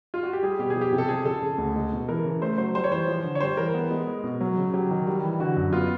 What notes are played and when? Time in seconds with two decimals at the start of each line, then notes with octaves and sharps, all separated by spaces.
0.14 F4
0.23 F#4
0.33 G4
0.42 G3 G#4
0.59 B2 G4
0.70 G#4
0.75 F3
0.81 G4
0.93 C3
0.98 A4
1.08 F3 G#4
1.25 C#3 A4
1.42 C#3
1.58 D2
1.76 G#3
1.92 B2
2.09 E3 A#4
2.25 C#3
2.42 A3 C5
2.58 F#3 C5
2.75 G3 C5
2.84 C#5
2.91 E3 C5
3.08 F3
3.24 D3
3.35 C#5
3.40 G3 C5
3.57 E3 A#4
3.74 B3
3.91 G#3
4.07 G#3
4.24 B2
4.41 F#3
4.58 C#3
4.74 F#3 G4
4.91 D#3
5.07 G3
5.23 E3
5.40 D3 F#4
5.57 F#2
5.73 B3 F4